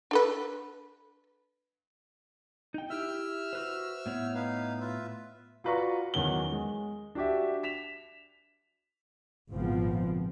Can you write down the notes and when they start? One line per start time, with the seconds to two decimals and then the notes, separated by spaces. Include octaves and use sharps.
0.11 D4 A4 B4
2.74 D#4 G5
2.90 E4 G4 E5 G5 E6 F6
3.53 F#4 B4 C5
4.06 A2 B3 C#5
4.34 D#4 B4 F5
4.80 F4 B4 E5
5.64 F4 F#4 B4 D5 A#5 C#6
6.14 E2 D#3 F#3 C#4 F#5 G7
6.52 G#3
7.15 D4 F#4 G4 E5
7.63 B6 E7 F7
9.52 G#1 A#2 C#3 F3 B3 C4